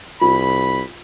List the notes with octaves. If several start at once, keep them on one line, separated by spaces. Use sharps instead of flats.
C2 F4 B5